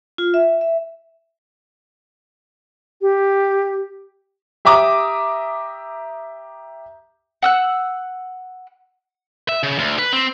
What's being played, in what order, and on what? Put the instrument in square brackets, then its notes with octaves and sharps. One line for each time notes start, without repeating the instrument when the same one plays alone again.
[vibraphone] F4
E5
E5
[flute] G4
[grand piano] G4 E5 A#5 D6 D#6
[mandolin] F#5 E6 F#6
[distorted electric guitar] E5
C#3
D2
B4
C4